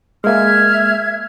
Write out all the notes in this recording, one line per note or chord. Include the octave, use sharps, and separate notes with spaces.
G#3 A#3 E5 F6 G#6